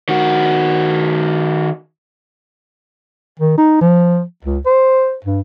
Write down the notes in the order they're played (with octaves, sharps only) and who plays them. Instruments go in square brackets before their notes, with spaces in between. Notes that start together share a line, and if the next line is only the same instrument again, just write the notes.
[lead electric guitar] D#3 F#4
[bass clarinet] D#3
D#4
F3
C#2
C5
G2